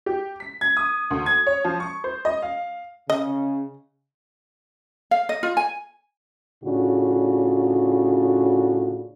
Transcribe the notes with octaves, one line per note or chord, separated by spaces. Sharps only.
G4
B6
G#6
D#6
D2
G#6
C#5
F3
C#6
C5
D#5
F5
C#3 D#5
F5
D#5
F4
G#5
A2 C#3 D4 F4 F#4